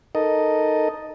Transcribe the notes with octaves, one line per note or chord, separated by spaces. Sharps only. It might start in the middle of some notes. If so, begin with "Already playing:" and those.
D#4 A4 A#4 D#5